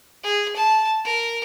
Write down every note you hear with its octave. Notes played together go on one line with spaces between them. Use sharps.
G#4
A5
A#4